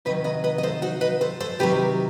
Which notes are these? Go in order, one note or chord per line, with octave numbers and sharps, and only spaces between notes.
C3 D#3 F#3 B4 D#5
B4 D#5
B4 D#5
D#5
A4 C5
D#4 F#4
B4 D#5
A4 C5
A4 C5
C3 D#3 F#3 G4 B4